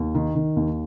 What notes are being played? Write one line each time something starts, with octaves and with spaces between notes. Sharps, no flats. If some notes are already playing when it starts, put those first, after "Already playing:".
Already playing: D#2
D#3
D#3
D#2